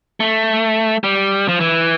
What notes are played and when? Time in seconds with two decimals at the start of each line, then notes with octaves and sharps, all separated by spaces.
0.20 A3
1.04 G3
1.48 F3
1.60 E3